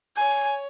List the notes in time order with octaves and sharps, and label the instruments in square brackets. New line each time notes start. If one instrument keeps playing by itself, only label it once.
[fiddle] C#5 [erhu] G#5